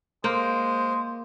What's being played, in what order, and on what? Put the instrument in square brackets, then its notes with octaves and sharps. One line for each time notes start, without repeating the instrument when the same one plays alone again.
[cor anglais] G#3 [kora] A#3 [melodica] C5